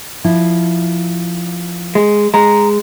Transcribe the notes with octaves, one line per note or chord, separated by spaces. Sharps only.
F3 E4
G#3
G#3 A#5